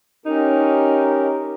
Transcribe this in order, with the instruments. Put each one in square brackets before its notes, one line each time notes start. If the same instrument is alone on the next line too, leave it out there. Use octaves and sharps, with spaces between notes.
[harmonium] C#4 G4 A#4 [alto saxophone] D#4